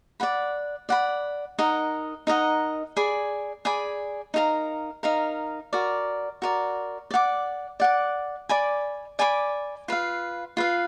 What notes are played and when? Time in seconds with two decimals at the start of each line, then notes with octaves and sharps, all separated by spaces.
0.20 D5 F#5 B5
0.89 D5 F#5 B5
1.58 D#4 A#4 D#5 F#5
2.27 D#4 A#4 D#5 F#5
2.97 G#4 D5 G#5 B5
3.65 G#4 D5 G#5 B5
4.34 D#4 A#4 F5 A#5
5.03 D#4 A#4 F5 A#5
5.73 F#4 A#4 D5
6.42 F#4 A#4 D5
7.11 D5 F#5 D6
7.80 D5 F#5 D6
8.49 D5 G#5 B5 D6
9.19 D5 G#5 B5 D6
9.88 F4 B4 F5
10.57 F4 B4 F5